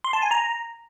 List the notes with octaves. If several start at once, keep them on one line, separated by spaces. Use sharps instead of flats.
C6
A5
G#5
A#5